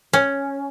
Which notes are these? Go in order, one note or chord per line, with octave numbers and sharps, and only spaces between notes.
C#4